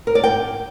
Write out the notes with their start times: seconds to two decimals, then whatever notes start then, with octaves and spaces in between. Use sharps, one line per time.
0.07 A#4
0.15 D5
0.24 G5